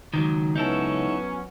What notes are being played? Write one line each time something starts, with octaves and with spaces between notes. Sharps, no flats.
C#2 D#3 E3 F#3
F#3 B3 C#4 D#4 E4 A4